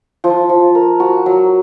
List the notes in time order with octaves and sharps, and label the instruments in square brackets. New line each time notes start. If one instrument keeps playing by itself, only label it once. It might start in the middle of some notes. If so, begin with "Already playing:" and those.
[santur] F3
F3
A#4
F#4
F#3